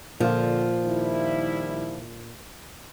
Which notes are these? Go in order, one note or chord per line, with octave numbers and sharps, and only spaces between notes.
A#2 D3 F3 F4
D#3 G3 E4